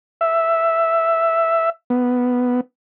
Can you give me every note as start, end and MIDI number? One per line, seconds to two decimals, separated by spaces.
0.21 1.70 76
1.90 2.61 59